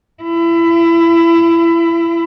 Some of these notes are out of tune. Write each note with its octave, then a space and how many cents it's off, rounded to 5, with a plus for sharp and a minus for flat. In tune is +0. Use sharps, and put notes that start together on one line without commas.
E4 +25